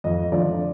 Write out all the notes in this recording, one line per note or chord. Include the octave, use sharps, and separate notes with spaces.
F2 D#5
D3 F3 A3 D5